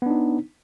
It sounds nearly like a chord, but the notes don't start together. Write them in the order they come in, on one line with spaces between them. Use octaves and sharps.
B3 D4 D#4